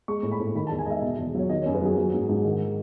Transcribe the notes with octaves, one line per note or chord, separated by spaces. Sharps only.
G#3 C#6
A2
B5
A2
D#3 B5
A5
E2
G#5
G#3 D#5 E5
B2
E2
F#3 C#5
D#3 D#5
C#5
F#2
B4
F#3 G#4
F#3
G#2
G#2
D#3